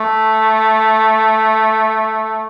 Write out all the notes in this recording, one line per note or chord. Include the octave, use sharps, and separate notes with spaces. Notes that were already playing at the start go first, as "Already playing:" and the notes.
Already playing: A3